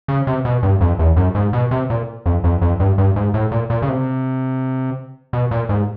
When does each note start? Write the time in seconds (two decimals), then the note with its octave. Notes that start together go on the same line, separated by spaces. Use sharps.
0.08 C#3
0.27 C3
0.45 B2
0.63 G2
0.81 F2
0.99 E2
1.16 F#2
1.35 G#2
1.53 B2
1.71 C3
1.90 A#2
2.26 F2
2.44 F2
2.62 F2
2.80 G2
2.98 G2
3.16 G#2
3.34 A2
3.52 A#2
3.70 A#2
3.82 C#3
3.89 C3
5.33 B2
5.51 A#2
5.69 G#2